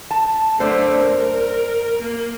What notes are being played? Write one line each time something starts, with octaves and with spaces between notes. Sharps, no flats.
A5
F#2 D3 A3 C5 D5
A#4
A#3